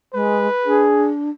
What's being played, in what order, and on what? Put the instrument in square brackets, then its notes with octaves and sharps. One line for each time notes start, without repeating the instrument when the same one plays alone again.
[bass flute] G#3 [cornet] B4
[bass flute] D4 [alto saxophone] G#4